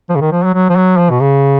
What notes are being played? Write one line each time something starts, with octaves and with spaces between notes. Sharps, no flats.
F3
C#3
D#3
F3
F#3
F#3
F3
F#3
F3
B2
C#3